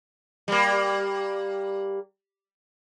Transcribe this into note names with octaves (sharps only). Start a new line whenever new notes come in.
G3 A#3